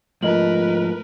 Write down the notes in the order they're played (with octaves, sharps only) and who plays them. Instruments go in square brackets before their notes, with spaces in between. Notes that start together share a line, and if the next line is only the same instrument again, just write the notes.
[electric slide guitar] G#2 F3 A3 [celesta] F4 D#5 F#7 [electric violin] A#4 B4